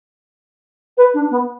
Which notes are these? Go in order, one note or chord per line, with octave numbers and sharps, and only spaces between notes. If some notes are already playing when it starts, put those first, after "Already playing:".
B4
D4
B3